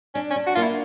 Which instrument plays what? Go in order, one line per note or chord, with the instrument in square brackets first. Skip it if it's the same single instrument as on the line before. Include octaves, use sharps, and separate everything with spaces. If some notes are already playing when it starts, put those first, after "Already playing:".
[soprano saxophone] C#4 [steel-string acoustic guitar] D4
[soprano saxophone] C#4
[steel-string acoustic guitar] D4
[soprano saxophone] F#4
[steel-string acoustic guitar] A#3 [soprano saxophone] F4
[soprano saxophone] E4